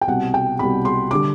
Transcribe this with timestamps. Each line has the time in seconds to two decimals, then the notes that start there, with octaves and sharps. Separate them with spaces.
0.01 G5
0.08 C2 B2 G3 F#5
0.34 G5
0.59 C2 B2 G3 B5
0.85 C6
1.11 D3 G3 D6